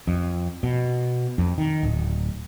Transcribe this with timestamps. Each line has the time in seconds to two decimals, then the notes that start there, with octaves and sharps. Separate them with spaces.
0.07 F2
0.63 B2
1.38 F2
1.58 D#3
1.83 D1